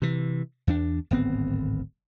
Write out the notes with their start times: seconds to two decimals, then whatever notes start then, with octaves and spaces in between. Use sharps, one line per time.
0.02 C3 E3
0.67 E2 D4
1.11 D1 G#1 B3 C4